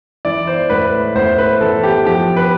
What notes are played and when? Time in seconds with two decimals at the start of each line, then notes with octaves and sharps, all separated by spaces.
0.25 E3 D5
0.47 C5
0.70 A2 B4
1.15 A2 C5
1.38 B4
1.61 E3 A4
1.83 G4
2.05 F3 G4
2.37 B4